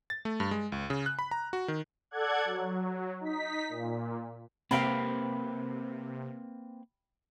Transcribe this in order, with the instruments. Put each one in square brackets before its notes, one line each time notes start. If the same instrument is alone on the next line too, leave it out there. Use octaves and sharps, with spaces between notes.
[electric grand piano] A6
A3
G2
G#3
C#2
C#3
F#6
B5
A#5
F#4
D#3
[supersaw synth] A4 D5 F#5 F#6 G#6
F#3
D#4 B6
A#2
[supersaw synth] C3 [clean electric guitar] A#3 C4 B4 [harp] F5 G5 B5